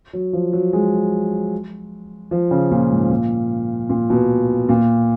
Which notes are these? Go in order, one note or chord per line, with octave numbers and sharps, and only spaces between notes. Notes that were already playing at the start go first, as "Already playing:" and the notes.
F#3
F3
F#3
G#3
F3
C#3
A#2
G#2
A#2
A#2
B2
A#2